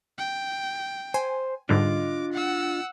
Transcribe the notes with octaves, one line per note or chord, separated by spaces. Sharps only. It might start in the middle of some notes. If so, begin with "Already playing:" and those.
G5
C5 G#5
G#2 D3 G3 D4 F4 D#5 D6
F#5 E6